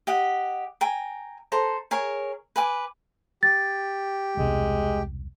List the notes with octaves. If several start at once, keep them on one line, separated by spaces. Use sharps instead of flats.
G4 D#5 F#5
G5 G#5 A#5
A4 C5 A#5
G#4 A#4 C#5
B4 G#5 D6
G4 A6
E1 C2 G#3